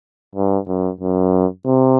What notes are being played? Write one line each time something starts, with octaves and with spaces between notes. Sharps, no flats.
G2
F#2
F#2
C3